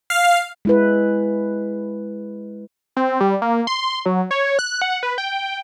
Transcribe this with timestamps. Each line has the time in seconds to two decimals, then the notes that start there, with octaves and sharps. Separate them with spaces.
0.10 F5
0.65 G#3 E4 B4
2.96 C4
3.20 G3
3.42 A#3
3.67 C6
4.06 F#3
4.31 C#5
4.59 F#6
4.82 F#5
5.03 B4
5.18 G5